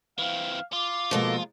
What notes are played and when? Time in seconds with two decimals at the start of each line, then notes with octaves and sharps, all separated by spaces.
0.18 E3 C4 F5
0.73 F4 D6
1.11 B2 F3 G#3 A#3 A4 A#4